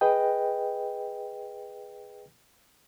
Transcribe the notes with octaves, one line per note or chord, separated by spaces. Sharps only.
G#4 B4 D#5 G5